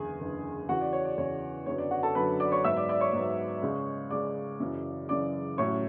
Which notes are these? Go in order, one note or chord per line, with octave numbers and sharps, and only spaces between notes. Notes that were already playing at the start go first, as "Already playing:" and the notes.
Already playing: F#1 E2 D3 G#4 G#5
F#1 E2 D3
E2 C#3 E3 F#4 F#5
D5
C#5
D5
E2 C#3 E3 C#5
F#2 D3 F#3 B3 C#5
D5
F#4 F#5
A4 A5
F#2 D3 F#3 B3 B4 B5
D5 D6
C#5 C#6
G#2 F#3 B3 E5 E6
D5 D6
D5 D6
C#5 C#6
G#2 F#3 B3
C#2 C#3 G#3
C#2 C#3 G#3 D5 D6
F#1 F#2 C#3 E3
F#1 F#2 C#3 E3 D5 D6
A1 A2 F#3 C#4 C#5 C#6